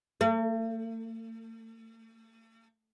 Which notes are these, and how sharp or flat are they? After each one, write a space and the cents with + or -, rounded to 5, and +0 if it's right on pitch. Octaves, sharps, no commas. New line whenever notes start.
A3 +45